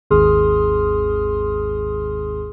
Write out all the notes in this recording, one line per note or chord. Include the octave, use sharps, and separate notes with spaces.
G#1 D#2 G#4 C6 D#6 F6